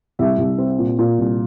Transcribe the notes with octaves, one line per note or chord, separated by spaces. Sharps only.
C2 E5
C2
C4
A#2
A#2
C2